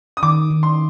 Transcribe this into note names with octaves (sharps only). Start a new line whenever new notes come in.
D#6
D#3 D6
D#3
C6